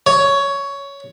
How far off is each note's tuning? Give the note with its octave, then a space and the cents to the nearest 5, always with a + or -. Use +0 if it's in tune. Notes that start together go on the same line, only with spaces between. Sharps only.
C#5 +10